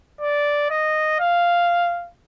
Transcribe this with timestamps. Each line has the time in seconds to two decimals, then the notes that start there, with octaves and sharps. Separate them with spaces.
0.21 D5
0.70 D#5
1.20 F5